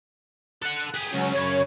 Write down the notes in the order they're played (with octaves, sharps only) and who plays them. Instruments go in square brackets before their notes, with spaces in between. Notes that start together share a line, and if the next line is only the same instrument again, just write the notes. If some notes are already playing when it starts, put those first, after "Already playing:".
[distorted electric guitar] A4 F#5 [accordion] F#6
[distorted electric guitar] G4 G#4
[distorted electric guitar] C#2 [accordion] F#3 C#4
[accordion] F#2 C#5 [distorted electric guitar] C#3